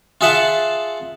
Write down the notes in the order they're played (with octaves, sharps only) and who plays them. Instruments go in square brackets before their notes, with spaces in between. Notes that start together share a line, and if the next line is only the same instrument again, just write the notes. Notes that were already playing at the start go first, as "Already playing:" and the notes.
[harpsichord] F4 G#4 E5 F#5 A5